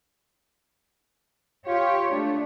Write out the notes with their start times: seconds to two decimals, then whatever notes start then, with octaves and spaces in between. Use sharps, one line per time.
1.67 F4 G4 C#5
2.12 A3 D4